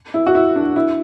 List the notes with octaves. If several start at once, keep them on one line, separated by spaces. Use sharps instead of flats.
E4
F#4
E4
D4
E4